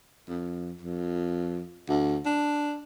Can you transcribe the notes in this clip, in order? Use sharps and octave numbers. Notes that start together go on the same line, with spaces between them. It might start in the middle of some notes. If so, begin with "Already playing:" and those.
F2
F2
D2
D4